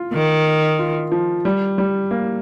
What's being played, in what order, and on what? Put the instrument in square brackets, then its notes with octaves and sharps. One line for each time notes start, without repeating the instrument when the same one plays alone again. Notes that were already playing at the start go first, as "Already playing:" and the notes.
Already playing: [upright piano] F4
[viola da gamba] D#3
[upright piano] F4
F3
G3
G3
A#3